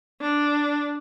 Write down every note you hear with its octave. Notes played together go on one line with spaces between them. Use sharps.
D4